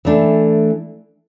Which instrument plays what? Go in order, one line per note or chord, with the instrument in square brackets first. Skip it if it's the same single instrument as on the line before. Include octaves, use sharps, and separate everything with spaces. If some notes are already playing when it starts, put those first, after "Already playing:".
[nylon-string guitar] E3 A3 D4